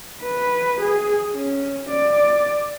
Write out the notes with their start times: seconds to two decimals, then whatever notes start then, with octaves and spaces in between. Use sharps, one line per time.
0.22 B4
0.81 G#4
1.35 C#4
1.90 D5